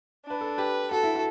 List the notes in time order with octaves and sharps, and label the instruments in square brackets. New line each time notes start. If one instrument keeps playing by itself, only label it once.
[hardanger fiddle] D4
[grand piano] B4
A4
[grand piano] G4 [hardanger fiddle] B4
[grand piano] F#4 [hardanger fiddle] A4
[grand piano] E4
F#4